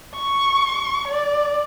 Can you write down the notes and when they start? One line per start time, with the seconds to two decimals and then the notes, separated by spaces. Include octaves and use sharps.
0.16 C#6
1.08 D5